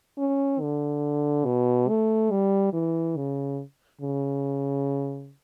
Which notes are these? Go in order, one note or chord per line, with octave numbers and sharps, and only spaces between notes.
C#4
D3
B2
A3
G3
E3
C#3
C#3